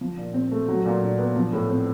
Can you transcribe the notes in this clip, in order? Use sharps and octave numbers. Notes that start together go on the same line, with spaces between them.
F3
A#2
C4
A3
F#3
A#2
D4
B3
F3
A2
C4